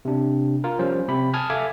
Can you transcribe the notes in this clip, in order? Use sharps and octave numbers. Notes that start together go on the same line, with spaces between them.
C3 D4
F4 A#4
F3 G3 C#4 C5
C3 G4 B5
G#5 A5 D#6 F6 G#6
A4 E5 F5 G#5 D6